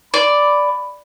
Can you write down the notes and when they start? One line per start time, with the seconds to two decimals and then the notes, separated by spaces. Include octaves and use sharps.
0.14 D5 B5